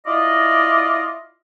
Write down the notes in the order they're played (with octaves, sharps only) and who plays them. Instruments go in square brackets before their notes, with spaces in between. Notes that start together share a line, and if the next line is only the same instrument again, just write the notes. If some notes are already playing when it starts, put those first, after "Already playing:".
[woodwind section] E4 F4 D5 D#5